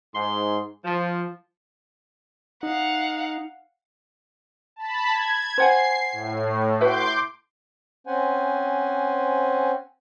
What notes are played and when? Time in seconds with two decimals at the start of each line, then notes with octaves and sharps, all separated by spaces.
0.15 G#2 C6
0.84 F3
2.63 D#4 F5 F#5
4.76 A5 B5
5.12 G#6
5.58 C5 F#5 G#5 C7
6.12 A2
6.81 F#4 B4 E5 C6 D6 G6
8.07 C4 C#4 C5 F#5 G#5